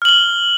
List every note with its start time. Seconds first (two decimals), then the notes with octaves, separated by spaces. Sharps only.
0.02 F6
0.05 F#7
0.09 G7